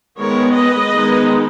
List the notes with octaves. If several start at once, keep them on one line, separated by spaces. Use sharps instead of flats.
D#3 G#3 B3 A#4 C#5
B4 D#5
D#3 G#3 B3 D#4